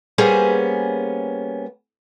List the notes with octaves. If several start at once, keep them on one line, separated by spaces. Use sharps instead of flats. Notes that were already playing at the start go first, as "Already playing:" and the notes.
G3 A#3 B3 C#4 G#4 C5